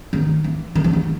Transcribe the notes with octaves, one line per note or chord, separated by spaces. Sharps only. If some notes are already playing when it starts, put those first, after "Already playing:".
D#3
E3
D#3
E3
D#3